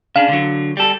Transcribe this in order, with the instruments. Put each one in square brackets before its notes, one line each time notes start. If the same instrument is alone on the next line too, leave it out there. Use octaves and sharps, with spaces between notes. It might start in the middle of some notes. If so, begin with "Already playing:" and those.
[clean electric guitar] C#3 D4 [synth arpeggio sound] F5
[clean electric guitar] D3 F#3
G3 A4